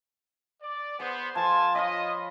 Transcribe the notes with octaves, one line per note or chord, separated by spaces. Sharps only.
D5
B3 G#4 C5
F3 A4 C5 G#5 A5
F4 C#5 D#5 B5